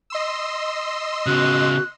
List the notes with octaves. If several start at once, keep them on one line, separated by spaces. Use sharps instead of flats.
D#5 C6 E6
C#3 B3 F#4 F#6